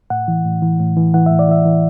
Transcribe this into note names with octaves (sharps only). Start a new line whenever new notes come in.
A2 F#5
E3
A2
E3
A2
E3
E3 F#5
A2 E5
D5
E3 E5
E3